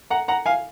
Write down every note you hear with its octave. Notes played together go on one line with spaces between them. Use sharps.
F#5 A#5
F#5 A#5
F5 G#5